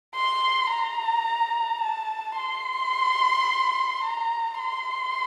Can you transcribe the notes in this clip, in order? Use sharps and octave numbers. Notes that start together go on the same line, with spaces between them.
C6
A#5
A5
C6
A#5
C6